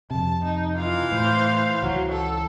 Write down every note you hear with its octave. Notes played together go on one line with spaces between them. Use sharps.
F2 C3 A5
D#4
E3 F4 F5
A2 C5
C#2 E3 F#3
A4